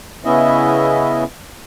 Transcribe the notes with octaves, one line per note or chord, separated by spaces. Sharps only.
C#3 B3 C#4 E4 D#5 E5